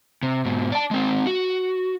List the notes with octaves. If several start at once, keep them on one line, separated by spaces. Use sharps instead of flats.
C3
G#2 B2
D5 A5
G#3 C4
F#4